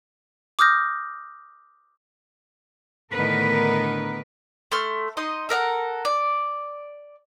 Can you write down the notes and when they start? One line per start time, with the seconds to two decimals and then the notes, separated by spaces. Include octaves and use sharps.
0.59 D6 D#6 F6 G6 A#6
3.13 A2 D3 D#3 B3 A#4 B4
4.72 A3 C6 F6
5.17 D#4 D#5 C6
5.49 A4 A#4 E5 F#5
6.05 D5